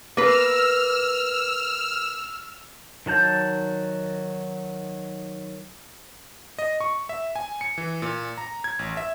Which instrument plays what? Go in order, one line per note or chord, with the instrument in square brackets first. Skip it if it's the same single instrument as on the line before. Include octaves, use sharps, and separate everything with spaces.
[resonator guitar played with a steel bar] A#3 B4 [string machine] E6 F6
[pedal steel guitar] D#3 F#3 A5 G6
[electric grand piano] D#5
C#6
E5
G#5
C#7
E3
A#2
A#5
G#6
A1
E5